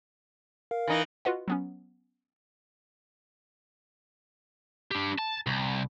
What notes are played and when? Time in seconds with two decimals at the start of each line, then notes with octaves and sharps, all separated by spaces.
0.71 A#4 F5
0.88 E3 D#4
1.25 F4 F#4 B4 D#5 F#5
1.48 F#3 B3 C#4
4.92 D4 G4
5.19 A5
5.47 C2